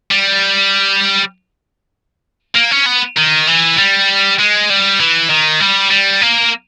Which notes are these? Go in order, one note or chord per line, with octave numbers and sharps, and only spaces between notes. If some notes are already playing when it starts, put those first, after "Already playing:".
G3
A#3
C#4
B3
D#3
E3
G3
G#3
G3
E3
D#3
G3
G3
A#3